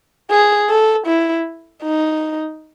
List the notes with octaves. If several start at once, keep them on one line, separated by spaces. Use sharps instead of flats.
G#4
A4
E4
D#4